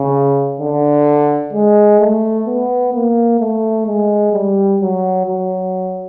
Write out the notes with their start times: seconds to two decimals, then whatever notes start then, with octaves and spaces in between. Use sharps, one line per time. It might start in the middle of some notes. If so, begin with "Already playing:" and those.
Already playing: C#3
0.60 D3
1.53 G#3
2.00 A3
2.47 B3
2.93 A#3
3.40 A3
3.87 G#3
4.33 G3
4.80 F#3
5.26 F#3